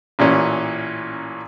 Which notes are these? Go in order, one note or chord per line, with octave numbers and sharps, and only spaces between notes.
A1 A#2 E3 C#4